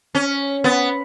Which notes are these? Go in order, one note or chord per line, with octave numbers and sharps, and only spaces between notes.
C#4
B3